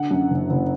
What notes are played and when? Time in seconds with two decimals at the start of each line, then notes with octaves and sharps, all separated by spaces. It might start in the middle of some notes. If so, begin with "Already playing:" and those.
Already playing: D3 F#5
0.11 F#2
0.30 F#1
0.50 F#1